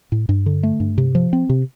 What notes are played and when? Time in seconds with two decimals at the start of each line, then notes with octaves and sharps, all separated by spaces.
0.12 A2
0.29 G2
0.46 D3
0.63 A3
0.80 G2
0.98 C3
1.15 F3
1.33 C4
1.49 C3